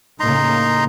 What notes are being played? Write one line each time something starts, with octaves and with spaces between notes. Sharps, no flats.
A2 C#3 A#3 D#4 A#5 C6